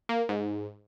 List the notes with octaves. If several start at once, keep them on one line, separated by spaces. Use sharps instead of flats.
A#3
G#2